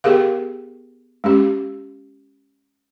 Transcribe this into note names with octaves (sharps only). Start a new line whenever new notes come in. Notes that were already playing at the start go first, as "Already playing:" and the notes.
B3 G4 G#4 A#4 F5
G#3 C#4 G4